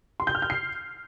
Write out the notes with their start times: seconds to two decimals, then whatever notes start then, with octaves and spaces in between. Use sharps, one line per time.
0.20 C6
0.27 G6
0.35 F6
0.42 G6
0.50 C7